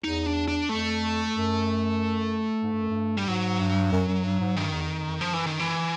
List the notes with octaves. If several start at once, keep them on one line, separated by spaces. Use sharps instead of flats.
E2 D#4
D4
D4
F2 A3
F#2
G#2
G2
F#2
G2
G3
G#2 F#3
G2
F#2
F#2
G2
G#2
G2 D#3
E2
F2
F2
F#2 F3
E3
D#3
E3